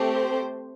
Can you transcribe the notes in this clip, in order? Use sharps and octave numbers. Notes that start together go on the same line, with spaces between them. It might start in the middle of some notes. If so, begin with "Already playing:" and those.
Already playing: A3 C4 G4
C5